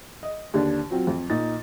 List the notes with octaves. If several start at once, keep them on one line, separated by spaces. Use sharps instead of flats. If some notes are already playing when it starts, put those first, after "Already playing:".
D#5
D#2 D3 D4
F#3 C4 F4
F2
A#2 D#4 A6